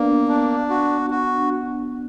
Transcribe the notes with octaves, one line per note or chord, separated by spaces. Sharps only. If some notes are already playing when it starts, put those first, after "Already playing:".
Already playing: A#3 B3 D4
D4
F#4
F#4